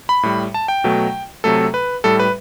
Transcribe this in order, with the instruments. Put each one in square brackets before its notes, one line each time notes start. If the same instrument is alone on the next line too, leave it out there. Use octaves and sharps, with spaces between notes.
[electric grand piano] B5
A2 G3
A5
G5
B2 F#3 A3
C3 F#3 A3 A4
B4
A2 G3 A4
B4